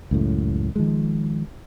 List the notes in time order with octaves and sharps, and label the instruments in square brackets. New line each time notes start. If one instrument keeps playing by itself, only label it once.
[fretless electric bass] C#2 F#2 A2
D#3 F3 G#3